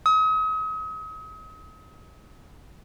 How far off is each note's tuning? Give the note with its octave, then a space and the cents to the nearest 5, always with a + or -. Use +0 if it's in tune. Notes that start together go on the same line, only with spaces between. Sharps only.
D#6 +40